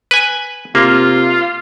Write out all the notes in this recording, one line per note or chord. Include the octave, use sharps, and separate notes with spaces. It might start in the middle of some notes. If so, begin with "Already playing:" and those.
B4 G#5
C3 A#3 F4